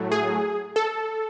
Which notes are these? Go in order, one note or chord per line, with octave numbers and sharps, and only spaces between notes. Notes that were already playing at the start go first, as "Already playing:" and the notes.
Already playing: A2 F#3 A3
G#4
A4